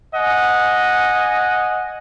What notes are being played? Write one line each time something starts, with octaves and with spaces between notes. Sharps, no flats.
D#5 F#5 G#5